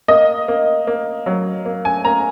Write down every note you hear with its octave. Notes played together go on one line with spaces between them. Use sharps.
A#3 D#5
A#3
A#3
F#3
A#3
G#5
A#3 A#5